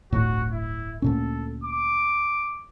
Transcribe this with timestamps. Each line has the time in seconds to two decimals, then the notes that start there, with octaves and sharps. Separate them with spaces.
0.12 D1 G1 A2 F#4
0.51 E4
1.02 D2 A#2 C#4 A4
1.64 D6